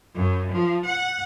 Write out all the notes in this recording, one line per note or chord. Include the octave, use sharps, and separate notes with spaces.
F#2
F3
F#5